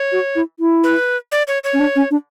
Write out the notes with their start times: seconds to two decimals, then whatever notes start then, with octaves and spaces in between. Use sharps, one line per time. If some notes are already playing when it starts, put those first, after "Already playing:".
Already playing: C#5
0.12 F#4
0.36 E4
0.60 E4
0.83 B4
1.32 D5
1.48 C#5
1.64 C#5
1.73 C#4
1.80 D4
1.96 C#4
2.11 D4